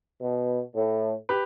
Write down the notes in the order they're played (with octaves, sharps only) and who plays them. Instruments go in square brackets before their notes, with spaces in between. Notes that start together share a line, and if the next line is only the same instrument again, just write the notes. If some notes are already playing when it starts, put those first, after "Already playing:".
[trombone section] B2
A2
[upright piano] G4 B4